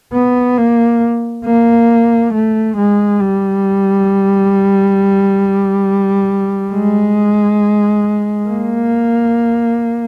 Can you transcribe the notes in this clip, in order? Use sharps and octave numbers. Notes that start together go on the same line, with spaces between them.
B3
A#3
A#3
A3
G#3
G3
G#3
A#3